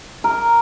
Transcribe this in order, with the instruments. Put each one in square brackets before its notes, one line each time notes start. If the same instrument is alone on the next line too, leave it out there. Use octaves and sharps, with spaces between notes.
[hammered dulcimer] A#4